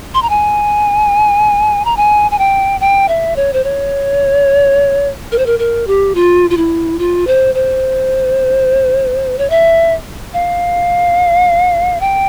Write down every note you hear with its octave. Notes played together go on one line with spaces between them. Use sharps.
C6
A#5
G#5
A#5
G#5
G#5
G5
G5
E5
C#5
C5
C#5
A#4
C5
A#4
A#4
G4
F4
F4
E4
F4
C5
C5
C#5
E5
F5
G5